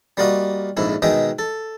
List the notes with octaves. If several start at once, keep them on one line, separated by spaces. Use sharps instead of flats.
G3 A#3 F4 F#4 D#5 F5
A#1 F2 G#2 E4
B2 D#3 G#3 D#5 E5 G5
A4